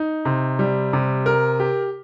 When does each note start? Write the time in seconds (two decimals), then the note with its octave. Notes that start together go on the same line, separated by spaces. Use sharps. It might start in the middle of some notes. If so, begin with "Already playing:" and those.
Already playing: D#4
0.25 C3
0.59 G3
0.93 C3
1.26 A#4
1.60 G4